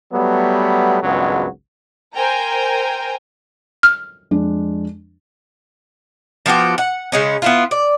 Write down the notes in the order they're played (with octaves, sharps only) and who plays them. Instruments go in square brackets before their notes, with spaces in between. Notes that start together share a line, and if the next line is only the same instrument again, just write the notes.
[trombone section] F#3 G3 A3 B3
G#1 C#2 G2 F#3 G#3 B3
[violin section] A#4 C5 G5 G#5 A#5
[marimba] F6
[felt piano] F2 G#3 D4
[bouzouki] F3 B3 F#4 G4
F#5
C#3 G#3 C#4
B3 E4 F4
D5